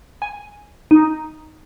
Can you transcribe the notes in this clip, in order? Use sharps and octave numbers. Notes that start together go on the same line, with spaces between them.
G#5
D#4